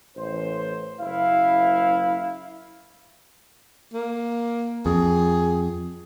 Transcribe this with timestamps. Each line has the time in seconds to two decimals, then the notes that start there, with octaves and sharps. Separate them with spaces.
0.16 A1 C5
1.00 F#1 E4 F5
3.94 A#3
4.86 F2 G#4